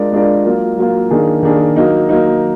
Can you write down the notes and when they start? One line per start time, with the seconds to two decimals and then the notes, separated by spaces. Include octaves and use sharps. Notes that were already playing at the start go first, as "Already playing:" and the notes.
Already playing: G#3 D4 F4 A#4 D5
0.12 G#3 D4 F4 A#4 D5
0.45 F#3 A#3 F4
0.77 F#3 A#3 F4
1.10 D#3 A#3 D4 G#4
1.43 D#3 A#3 D4 G#4
1.76 F#3 A#3 D#4
2.09 F#3 A#3 D#4